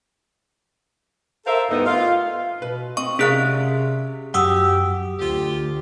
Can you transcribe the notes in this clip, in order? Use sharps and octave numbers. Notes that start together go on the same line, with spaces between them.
A4 A#4 C5 E5 F5
D2 G2 A3 B3 D#4 E4
F4 F5
B2 B4
C4 D#5 C#6
C3 C#4 G#4 A#4 D5 F5 F#6
F#2 G4 F#5 D#6 E6
D2 F4 G4